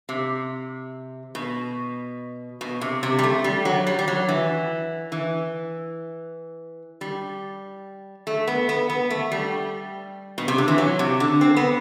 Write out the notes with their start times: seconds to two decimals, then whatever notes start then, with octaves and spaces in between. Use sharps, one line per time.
0.09 C3
1.35 B2
2.61 B2
2.81 C3
3.03 C3
3.19 G3
3.23 A3
3.44 G3
3.65 F#3
3.87 G3
3.99 G3
4.08 F#3
4.29 E3
5.12 E3
7.01 G3
8.27 A3
8.47 B3
8.69 B3
8.90 B3
9.11 A3
9.32 G3
10.38 B2
10.48 C3
10.58 D3
10.68 E3
10.78 F#3
10.99 C3
11.20 D3
11.41 C4
11.57 B3